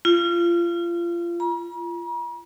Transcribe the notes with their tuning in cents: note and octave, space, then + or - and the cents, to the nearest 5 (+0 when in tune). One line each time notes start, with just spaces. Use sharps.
F4 -30
A#5 +45